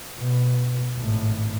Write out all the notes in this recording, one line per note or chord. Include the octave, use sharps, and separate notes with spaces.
B2
G#1 A2